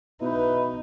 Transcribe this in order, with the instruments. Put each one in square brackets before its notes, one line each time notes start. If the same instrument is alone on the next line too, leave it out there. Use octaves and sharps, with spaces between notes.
[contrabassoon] B2 [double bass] D#4 [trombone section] E4 B4